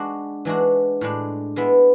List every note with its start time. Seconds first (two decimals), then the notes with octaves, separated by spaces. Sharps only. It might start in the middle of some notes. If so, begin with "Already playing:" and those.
Already playing: G#3 D4 F#4
0.45 E3 G#3 D4 F#4
1.01 A2 G#3 D4
1.56 G#3 B3 E4